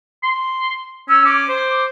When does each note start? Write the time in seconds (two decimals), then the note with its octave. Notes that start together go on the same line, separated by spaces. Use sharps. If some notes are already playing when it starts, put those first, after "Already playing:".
0.23 C6
1.08 C#4 E6
1.24 C#4 D6
1.49 C5